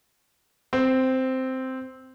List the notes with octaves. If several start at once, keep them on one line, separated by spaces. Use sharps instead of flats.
C4